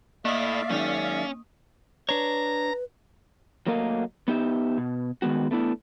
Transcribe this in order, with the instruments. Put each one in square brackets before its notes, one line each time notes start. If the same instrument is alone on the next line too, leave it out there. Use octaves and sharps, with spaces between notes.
[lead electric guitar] A3 E4 [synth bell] A#3 D#6 [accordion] D5 E5 F5
[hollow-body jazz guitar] F#2 D#3 G#3 [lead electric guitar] C#4
[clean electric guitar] D4 C#5 [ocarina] B4 [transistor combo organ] A#5
[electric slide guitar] F#3 A3 A#3 A#4 D#5 F5
B3 D#4 G4 E5
B2
D#3 G#3 B3 F#4
A3 B3 D4 E4